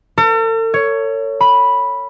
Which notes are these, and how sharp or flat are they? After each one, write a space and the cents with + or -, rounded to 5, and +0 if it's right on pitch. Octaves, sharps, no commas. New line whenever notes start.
A4 +45
C#5 +10
B5 -5